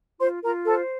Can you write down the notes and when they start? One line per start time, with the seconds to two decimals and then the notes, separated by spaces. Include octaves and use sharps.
0.19 F4 C5 C6
0.43 F4 A#4 A#5
0.67 A4 C5 A5